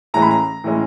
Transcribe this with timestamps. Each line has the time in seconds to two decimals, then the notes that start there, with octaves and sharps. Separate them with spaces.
0.14 A2 E3 G#3 C#4 A#5
0.22 B5
0.31 A#5
0.64 A2 E3 G#3 C#4